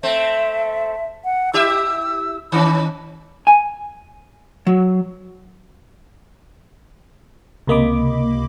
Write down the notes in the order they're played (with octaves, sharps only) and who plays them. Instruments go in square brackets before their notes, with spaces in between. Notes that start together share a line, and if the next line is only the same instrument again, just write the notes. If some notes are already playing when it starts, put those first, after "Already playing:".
[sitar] A3 C4 [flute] E5
[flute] F#5
[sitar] E4 G4 E5 [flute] E6
[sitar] D#3 C#4 [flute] B5
[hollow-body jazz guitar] G#5
F#3
[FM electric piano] C#2 C3 A#3 D#5 B5 D6